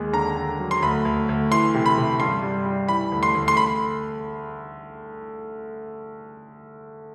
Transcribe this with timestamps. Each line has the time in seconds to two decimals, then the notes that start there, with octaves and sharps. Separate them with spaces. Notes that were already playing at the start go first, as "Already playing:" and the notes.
Already playing: D#2 G#3
0.13 D3 A#5
0.36 D3
0.60 F#3
0.71 C6
0.82 D2 B5
1.05 D2
1.29 D2
1.51 E3 C6
1.75 C3
1.86 B5
1.97 C3
2.20 G2 C6
2.43 G3
2.66 G3
2.88 E3 B5
3.12 D2
3.23 C6
3.35 D2
3.48 C6
3.57 B5